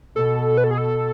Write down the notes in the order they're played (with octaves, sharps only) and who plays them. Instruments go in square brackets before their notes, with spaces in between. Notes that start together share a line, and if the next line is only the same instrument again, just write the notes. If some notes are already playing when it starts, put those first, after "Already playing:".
[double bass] B2 [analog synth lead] A4
[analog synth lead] B4
A4
G#4
A4